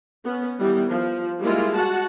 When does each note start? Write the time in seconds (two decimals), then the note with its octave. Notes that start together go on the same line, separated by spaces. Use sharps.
0.24 B3 C#4
0.59 D#3 E3 G3 B3
0.90 F3
1.40 G3 G#3 A#3 E4 F4
1.75 F#4 F#5 A5